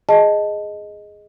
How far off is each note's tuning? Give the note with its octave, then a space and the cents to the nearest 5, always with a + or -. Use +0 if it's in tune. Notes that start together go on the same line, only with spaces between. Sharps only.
G#4 +0 D#5 +0 A5 +0